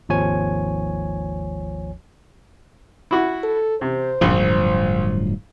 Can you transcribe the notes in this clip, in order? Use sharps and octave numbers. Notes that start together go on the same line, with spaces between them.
G#1 D#2 F3 C#5 G#5
E4 F#4
A4
C3 C5
D1 A#1 G2 F3